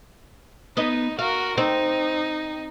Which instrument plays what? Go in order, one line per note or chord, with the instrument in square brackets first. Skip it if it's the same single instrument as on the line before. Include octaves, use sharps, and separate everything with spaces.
[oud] B3 B4 D#5 [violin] D#4
[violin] F#4 A#4 [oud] F5
[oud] C4 [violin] D#4